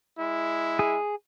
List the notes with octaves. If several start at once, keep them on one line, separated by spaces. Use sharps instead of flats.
G#3 E4
G#4